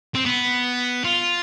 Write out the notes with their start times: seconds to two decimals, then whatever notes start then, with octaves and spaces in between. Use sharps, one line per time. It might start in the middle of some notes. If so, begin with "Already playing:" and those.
0.15 C4
0.25 B3
1.05 F4